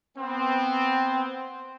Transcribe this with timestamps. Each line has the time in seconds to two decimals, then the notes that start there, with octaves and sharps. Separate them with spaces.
0.15 B3 C4